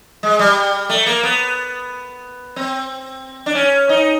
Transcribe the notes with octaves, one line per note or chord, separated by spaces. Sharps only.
G#3
G3
A3
A#3
B3
C4
D4
C#4
D#4